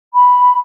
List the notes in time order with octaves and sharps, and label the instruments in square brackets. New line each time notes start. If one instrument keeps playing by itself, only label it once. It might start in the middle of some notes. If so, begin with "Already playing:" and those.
[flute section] B5